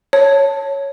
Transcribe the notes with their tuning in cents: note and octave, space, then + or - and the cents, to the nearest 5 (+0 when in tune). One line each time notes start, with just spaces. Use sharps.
C#5 +0 A5 +10